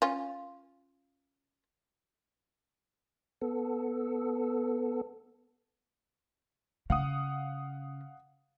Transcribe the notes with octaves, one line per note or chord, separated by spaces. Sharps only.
C#4 F4
B3 A4
C#3 F5 F#5 D#6